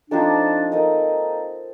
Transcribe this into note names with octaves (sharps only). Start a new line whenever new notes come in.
F3 C4 D4 D#4 A4
A#3 D#4 A4 D#5